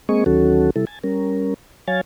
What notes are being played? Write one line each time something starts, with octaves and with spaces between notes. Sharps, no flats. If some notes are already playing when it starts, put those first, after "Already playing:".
G#3 A#3 C4 G#4 D#5 C#6
D2 D#3 F#3 C#4 F#4 A4
C3 G3 E4 A4
G#5 A5
G3 C#4 A#4
F#3 C#5 F5 G#5 A6